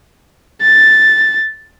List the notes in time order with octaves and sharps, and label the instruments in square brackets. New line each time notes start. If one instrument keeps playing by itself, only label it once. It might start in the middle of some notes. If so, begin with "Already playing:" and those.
[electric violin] A6